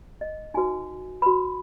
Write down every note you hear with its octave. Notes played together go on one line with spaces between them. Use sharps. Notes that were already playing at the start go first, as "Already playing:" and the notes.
D#5
D#4 F#4 B4 G#5
F#4 B4 B5